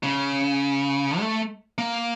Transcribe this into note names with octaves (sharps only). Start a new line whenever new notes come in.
C#3
A3
A#3